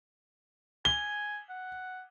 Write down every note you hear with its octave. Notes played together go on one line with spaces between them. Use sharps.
G#5 G7
F#5